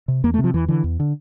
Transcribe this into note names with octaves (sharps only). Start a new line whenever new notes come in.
C3
E2 A#3
A3
C3
F3
E2 E3
D3 E3
E2
D3